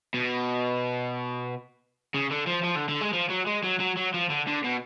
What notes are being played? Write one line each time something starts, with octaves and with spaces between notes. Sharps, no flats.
B2
C#3
D3
F3
F3
D3
D3
G#3
F3
F#3
G#3
F#3
F#3
F#3
F3
D3
D3
B2